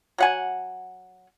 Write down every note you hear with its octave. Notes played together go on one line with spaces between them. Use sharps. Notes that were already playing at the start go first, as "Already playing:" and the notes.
F#3 F#5 G#5